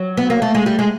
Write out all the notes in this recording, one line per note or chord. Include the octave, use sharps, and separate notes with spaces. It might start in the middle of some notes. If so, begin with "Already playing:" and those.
Already playing: F#3
B3
A#3
A3
G#3
G3
G#3